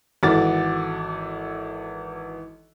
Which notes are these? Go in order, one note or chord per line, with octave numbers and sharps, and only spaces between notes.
G#1 E3 F#4 A4 D6 A6